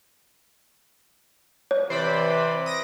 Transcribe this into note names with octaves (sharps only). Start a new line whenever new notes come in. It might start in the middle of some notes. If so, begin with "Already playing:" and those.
C#5
C3 E3 C5 D5 B5
D#6 A#6 D7